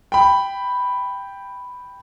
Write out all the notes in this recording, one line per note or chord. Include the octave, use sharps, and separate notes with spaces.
G5 B5